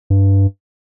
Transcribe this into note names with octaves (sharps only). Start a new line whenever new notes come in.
G2